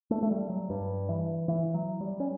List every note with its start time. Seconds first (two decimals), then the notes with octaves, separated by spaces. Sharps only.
0.11 A3
0.23 A3
0.31 G3
0.50 F#3
0.70 G2
1.09 E3
1.48 E3
1.74 F#3
2.01 G3
2.20 C#4